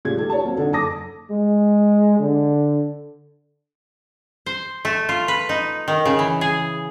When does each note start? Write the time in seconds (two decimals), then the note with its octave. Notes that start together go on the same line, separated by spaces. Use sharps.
0.05 A#2 C#3 G3 A3 G#6
0.18 D#3 G4 A4
0.30 C#5 A5
0.43 F#3 A#3 C4
0.57 D3 D4 D#4 A4
0.72 F#1 A4 A5 D6 D#6 A#6
1.31 G#3
2.19 D3
4.46 C5
4.85 A3
5.09 F4
5.28 B4
5.49 D#4
5.88 D#3
6.05 C#3
6.19 E3
6.41 G#4